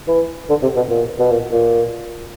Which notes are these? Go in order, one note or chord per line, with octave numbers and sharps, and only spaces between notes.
E3
D3
C3
B2
A#2
B2
A#2
A#2